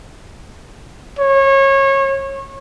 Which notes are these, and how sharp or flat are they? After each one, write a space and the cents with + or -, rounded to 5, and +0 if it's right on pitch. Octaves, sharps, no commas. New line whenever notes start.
C#5 -25